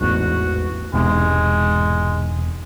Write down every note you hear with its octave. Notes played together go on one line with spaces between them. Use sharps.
A1 E2 G#2 F#4
E1 E2 G#2 C3 G#3